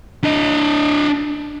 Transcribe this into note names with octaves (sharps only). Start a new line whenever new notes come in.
D4 D#5